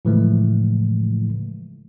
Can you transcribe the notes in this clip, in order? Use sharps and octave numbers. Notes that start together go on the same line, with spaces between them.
A2 C#3 E3 F3 G#3 A3